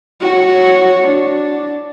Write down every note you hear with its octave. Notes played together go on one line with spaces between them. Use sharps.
F#4 C#5
D4